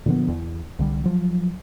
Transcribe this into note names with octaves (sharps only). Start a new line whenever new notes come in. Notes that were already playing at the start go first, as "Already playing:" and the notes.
A#2 D3 F3 B3
E2
C2 D3 G3
F3 F#3